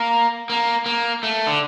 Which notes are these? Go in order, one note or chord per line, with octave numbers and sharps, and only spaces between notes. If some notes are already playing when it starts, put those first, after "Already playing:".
Already playing: A#3
A#3
A#3
A3
D3